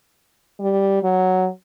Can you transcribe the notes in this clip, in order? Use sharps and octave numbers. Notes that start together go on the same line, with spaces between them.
G3
F#3